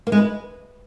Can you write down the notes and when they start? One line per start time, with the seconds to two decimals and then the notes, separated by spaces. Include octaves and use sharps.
0.07 A#3
0.12 G#3
0.18 B4